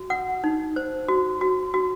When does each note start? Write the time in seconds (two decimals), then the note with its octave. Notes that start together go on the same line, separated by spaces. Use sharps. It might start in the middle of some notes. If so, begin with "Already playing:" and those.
Already playing: F#4
0.10 F#5
0.44 D#4
0.76 C5
1.08 F#4
1.41 F#4
1.74 F#4